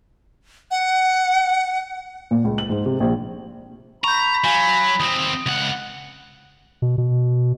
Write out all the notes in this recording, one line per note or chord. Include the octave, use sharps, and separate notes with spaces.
F#5
A#2
C#2
F#7
G#2
C3
A#1
A#5 B5 C#6 G6
F#3 F5 G#5 G6
D#2 C4 D#6
C#2 F#5
B2
B2